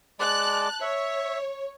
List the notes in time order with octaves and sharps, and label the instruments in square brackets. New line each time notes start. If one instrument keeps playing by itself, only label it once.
[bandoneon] G#3 D5 [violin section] A5 F#6
[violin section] C#5 [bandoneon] E5